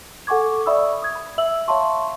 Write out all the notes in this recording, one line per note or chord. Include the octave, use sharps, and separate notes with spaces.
A4 F#5 G#5 C#6 D6 G#6
D5 E5 B5 C#6 D#6 E6
D#6 G#6
B5
E5 E6 F#7
C#5 E5 F5 A5 C6 C#6